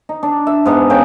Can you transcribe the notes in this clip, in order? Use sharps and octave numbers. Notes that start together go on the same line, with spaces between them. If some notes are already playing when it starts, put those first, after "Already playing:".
D#4
D4
E5
G#2 B3 D#4
C#3 G5